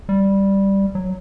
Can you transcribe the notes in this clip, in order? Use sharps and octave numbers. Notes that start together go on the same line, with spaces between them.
G3
F#3